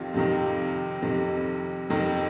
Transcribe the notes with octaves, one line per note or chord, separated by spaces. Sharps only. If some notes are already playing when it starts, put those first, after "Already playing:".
Already playing: F2 C3 D#3 F4 G4
F2 C3 D#3
F2 C3 D#3
F2 C3 D#3